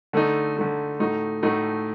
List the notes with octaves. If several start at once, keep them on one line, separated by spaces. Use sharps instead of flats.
D3 A3 D#4
D3 A3 D#4
A2 A3 D#4 F#4
A2 A3 D#4 F#4